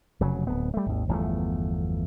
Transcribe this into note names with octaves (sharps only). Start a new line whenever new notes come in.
F1 C#3 F#3
D1 B3
G3 A3
G#1 D#2
G1 E2 F3 A3